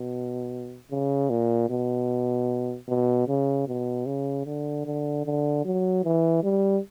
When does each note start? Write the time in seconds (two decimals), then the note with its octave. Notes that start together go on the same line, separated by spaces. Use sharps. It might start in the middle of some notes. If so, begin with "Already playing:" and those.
Already playing: B2
0.91 C#3
1.30 A#2
1.70 B2
2.88 B2
3.28 C#3
3.67 B2
4.06 C#3
4.46 D3
4.86 D3
5.25 D3
5.65 F#3
6.04 E3
6.43 G3